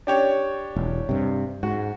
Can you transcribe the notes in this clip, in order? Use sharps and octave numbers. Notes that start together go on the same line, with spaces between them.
D4 G4 C#5
E1
G2 C3
G#2 F#4